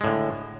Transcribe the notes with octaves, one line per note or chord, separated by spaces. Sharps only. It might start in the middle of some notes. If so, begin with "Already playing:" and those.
A2 D3 G#3